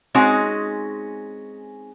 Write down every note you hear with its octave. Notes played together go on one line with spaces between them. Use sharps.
G#3 C4 C#4 D#4 F#4